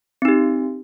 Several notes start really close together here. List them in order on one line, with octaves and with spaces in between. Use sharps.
C4 D#4 G4